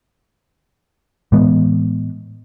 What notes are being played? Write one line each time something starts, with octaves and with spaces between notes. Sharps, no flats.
A2 E3 G#3 B3